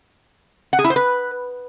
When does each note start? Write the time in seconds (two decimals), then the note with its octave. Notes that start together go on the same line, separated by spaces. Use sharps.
0.73 F#5
0.79 G#4
0.84 E4
0.90 C5
0.96 B4